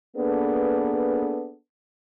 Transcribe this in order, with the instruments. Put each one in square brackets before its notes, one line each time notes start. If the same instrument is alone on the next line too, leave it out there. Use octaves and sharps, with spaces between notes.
[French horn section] A#3 B3 D4 G#4 A4 B4